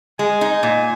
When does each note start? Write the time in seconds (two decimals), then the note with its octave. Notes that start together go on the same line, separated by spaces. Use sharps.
0.19 G#3 G#5
0.41 D#4
0.63 A#2